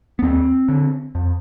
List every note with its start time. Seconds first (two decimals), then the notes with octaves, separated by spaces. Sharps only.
0.19 B3
0.22 D#2 C4
0.68 D3
1.15 F2